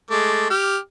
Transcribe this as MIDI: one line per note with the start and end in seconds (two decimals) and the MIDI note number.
0.11 0.48 56
0.11 0.48 57
0.11 0.48 86
0.50 0.77 67
0.50 0.77 89